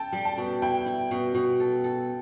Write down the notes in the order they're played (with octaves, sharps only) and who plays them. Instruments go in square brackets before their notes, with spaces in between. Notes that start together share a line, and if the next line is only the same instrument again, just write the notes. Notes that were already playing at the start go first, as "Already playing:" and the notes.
Already playing: [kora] A4 [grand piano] G5 A5
[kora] G3
[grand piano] A5
[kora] B2
[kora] E4 [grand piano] G5
[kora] E4
B2
B2
A4
A4